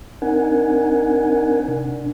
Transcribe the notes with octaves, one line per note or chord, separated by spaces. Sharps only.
C4 D4 D#4 A#4 F#5 G#5
C3 D4